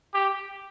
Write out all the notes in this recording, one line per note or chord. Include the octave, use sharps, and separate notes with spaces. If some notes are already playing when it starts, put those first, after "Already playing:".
G4